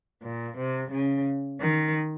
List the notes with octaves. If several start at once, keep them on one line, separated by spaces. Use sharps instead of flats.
A#2
C3
C#3
D#3